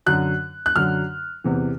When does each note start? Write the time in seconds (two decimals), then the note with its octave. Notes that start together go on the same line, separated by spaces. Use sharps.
0.06 F#2 D3 F#3 F#6
0.66 F#6
0.76 F#2 D3 F#3 F6
1.44 E2 C3 E3